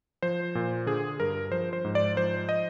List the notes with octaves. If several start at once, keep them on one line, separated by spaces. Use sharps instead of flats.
F3 C5
A#2
D3 G#4
G2 A#4
F3 C5
C5
G#2
D5
F3 C5
D#5